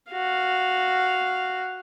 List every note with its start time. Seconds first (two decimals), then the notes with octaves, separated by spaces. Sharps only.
0.12 F#4 F5